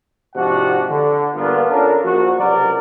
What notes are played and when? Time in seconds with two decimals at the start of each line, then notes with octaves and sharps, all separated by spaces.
0.36 G#2 C3 F3 D4 F#4 F#5
0.90 D3
1.35 G2 D3 A#3 B3 D4 F4
1.70 C#4 D4 F4 A4 A#4
2.04 A#1 F#4
2.39 C#2 C3 F#3 A#4 D5